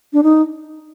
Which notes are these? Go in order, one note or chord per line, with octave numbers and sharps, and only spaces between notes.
D4
D#4